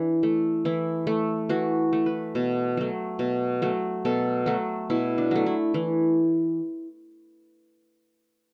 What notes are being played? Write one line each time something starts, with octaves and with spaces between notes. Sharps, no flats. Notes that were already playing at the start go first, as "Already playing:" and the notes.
Already playing: E3 D4
A3
E3 E4
A3
E3 F#4
A3
B4
B2
F#3 A3
B2
F#3 A3
B2 A4
F#3 A3 F#4
B2 E4
D4
F#3 A3
E4
E3